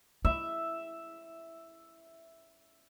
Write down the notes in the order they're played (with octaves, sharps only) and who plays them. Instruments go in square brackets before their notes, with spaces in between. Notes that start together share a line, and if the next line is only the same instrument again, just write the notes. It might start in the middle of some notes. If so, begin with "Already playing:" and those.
[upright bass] E4 [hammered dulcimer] E5